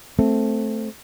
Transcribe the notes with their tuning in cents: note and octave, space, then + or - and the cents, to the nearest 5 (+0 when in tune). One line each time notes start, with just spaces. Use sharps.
A3 +0 C4 +0